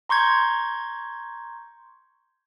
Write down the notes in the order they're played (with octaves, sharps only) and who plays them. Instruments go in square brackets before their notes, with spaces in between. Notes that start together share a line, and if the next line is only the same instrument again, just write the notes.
[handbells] A#5 C6 C#6 G6 G#6